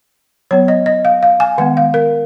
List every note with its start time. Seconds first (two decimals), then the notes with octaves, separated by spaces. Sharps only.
0.51 F#3 B3 C#5
0.68 D#5
0.86 D#5
1.05 F5
1.23 F5
1.40 G#5
1.58 D#3 G#3 B3 F#5
1.77 F5
1.94 A#4